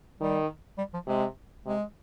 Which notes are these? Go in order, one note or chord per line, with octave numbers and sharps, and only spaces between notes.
D#3 G3
G3
F3
C3 G#3
C3 G#3